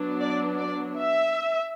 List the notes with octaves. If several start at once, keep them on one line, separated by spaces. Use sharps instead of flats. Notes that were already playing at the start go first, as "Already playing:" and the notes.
Already playing: F#3 B3 D4
D5
D5
E5